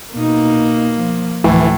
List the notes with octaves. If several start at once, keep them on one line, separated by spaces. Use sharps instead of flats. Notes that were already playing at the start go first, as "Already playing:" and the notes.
B2 A#3 D#4
F3
D2 A2 E3 F3